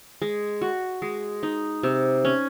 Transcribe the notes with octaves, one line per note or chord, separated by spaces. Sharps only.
G#3
F#4
G#3
D#4
C3
C#4